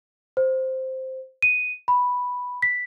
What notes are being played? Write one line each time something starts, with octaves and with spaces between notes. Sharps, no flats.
C5
D#7
B5
B6